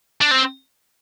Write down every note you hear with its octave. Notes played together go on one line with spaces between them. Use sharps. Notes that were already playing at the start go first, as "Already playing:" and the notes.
D4
C4